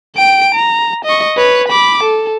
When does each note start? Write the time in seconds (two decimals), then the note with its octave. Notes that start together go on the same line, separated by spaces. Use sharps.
0.16 G5 D7
0.54 A#5
1.05 D#5 C#6
1.37 B4 C#5
1.68 B5 D6
2.03 A4